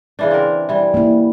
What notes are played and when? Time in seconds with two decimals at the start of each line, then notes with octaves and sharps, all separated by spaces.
0.19 C#3 E3 D4
0.31 C4 A#4
0.69 E3 G3
0.94 A#3 E4